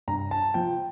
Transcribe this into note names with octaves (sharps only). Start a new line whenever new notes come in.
G2 A#5
A5
F3 G5